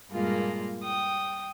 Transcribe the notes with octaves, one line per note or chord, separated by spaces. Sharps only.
G2 A#2 G#3 A#3 F4
G5 D#6